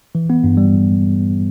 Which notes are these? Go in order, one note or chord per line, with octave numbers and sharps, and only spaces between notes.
E3
B3
G2
G3